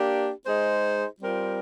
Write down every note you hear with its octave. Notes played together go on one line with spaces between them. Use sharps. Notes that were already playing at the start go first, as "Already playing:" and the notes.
Already playing: A#3 D4 G4
G#3 D#4 G#4 C5
G3 C4 F4 A#4